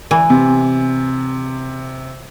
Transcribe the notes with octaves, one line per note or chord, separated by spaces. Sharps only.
E3
C3